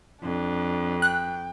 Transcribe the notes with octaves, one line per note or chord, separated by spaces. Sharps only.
F2 D4
G5 F#6